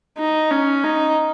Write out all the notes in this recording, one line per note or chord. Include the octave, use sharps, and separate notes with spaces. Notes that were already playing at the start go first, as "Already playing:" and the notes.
D#4
C#4
D#4